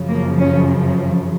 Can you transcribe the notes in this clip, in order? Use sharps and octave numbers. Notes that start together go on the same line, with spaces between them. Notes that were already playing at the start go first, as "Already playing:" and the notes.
Already playing: F#2 C#3 F3
A#3
C#4